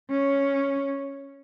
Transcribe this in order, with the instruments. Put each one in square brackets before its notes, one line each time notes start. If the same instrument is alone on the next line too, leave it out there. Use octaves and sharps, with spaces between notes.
[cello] C#4